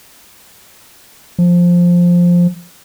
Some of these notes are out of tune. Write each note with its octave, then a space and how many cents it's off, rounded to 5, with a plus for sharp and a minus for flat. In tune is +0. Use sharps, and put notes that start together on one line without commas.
F3 +5